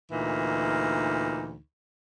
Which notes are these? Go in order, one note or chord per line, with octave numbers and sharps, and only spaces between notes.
D2 A#2 E3 D#4